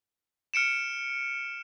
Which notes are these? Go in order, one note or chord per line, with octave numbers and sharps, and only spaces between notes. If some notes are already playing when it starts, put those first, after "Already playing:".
F6 C#7 D7 E7